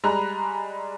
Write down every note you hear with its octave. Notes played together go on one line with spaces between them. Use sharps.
G3 G#3 A#5 B5 F#6